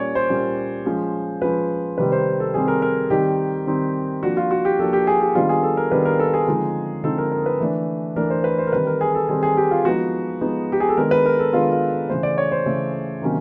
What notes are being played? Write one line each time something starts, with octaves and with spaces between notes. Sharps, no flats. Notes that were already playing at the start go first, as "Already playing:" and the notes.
Already playing: A#2 G3 A#3 C#4 C#5 D5
C5
A#2 G3 A#3 C#4
F3 G#3 C#4
F3 G#3 C#4 B4
C3 D#3 G3 C4 B4
C5
A4
C3 D#3 G3 C4 G#4
A#4
A#4
D#3 G3 C4 D#4 G4
D#3 G3 C4 D#4
F3 A#3 D4 F#4
F4
F#4
G4
F3 A#3 D4 A4
G4
G#4
G4
D#3 G3 B3 D4 F4
G#4
A4
A#4
D#3 G3 B3 D4 B4
A#4
A4
G#4
D3 F3 G#3 C4 D#4
D3 F3 G#3 C4 D#4 A4
A#4
A#4
B4
E3 A3 D4
E3 A3 D4 A#4
C5
B4
C5
A#4
D#3 G3 C4 B4
A#4
G#4
A4
D#3 G3 C4 G#4
G#4
G4
F4
F3 G#3 B3 D#4 F#4
F3 G#3 B3 D#4
G4
G#4
A4
D#3 G#3 B3 D4 A#4
B4
A#4
A4
D#3 G#3 B3 D4 F4
F4
C#3 E3 A3 C5
D5
C#5
C5
C#3 E3 A3
C3 D#3 F#3 A#3 C#4